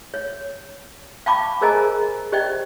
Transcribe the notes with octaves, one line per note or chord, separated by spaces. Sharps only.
C#5
F5 G5 A5 B5 C#6 D6
G#4 A#4 C5 D#5 G#5 A#5
G4 C5 D5 D#5 G5